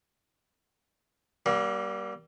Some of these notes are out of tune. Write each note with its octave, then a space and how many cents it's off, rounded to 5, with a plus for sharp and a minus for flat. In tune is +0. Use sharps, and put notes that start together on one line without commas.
G3 -20 A#3 +35